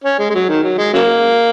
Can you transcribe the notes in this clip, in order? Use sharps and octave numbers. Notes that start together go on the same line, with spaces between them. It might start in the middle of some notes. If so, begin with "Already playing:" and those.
C#4
G#3
G#3
F#3
D#3
F#3
G#3
C#3 F#3 A#3